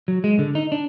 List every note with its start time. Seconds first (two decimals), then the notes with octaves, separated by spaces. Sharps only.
0.08 F#3
0.24 G#3
0.39 D3
0.55 D#4
0.72 D4